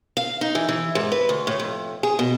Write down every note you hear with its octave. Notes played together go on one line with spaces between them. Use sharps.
F5
D#4
E3
E3
G#2
B4
D2
A2
F2
G#4
B2